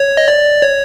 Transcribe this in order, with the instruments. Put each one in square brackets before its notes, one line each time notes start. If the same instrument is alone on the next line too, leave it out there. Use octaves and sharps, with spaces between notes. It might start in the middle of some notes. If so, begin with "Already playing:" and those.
Already playing: [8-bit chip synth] C#5
D#5
D5
C#5